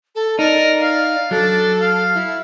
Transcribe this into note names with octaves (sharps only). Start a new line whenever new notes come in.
A4
D#4 A#4 D5
F5
F#3 D4 A4
F5
E4